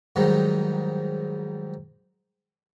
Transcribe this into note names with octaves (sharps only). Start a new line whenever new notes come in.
G#2 D#3 F#3 G3